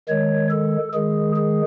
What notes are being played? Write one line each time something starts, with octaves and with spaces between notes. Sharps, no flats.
D#3 G#3 C#5
A4
D#3 G#3 G#4
G#4